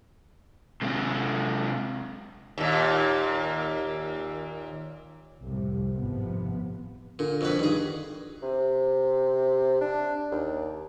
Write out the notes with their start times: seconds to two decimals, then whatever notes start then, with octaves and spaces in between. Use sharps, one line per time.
0.82 C3 G#3
2.58 D#2 A#2
5.43 C2 F2 A2 C3
5.95 G#1 A2 C3 F3 B3
7.19 A#2 D3
7.41 F2 B2 B4
7.59 G2 D#3 G#4
8.43 C3
9.81 D4
10.32 D#2